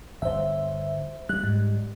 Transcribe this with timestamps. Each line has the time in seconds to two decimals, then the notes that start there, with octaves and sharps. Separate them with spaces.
0.22 G1 C5 E5
1.29 G3 F#6
1.44 G#2